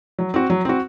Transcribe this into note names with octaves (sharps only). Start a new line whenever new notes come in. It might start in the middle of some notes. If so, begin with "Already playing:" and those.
F#3
C4 F#4
F#3
C4 F#4